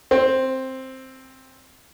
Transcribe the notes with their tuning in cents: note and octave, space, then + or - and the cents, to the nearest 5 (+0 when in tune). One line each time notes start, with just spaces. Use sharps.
C4 +5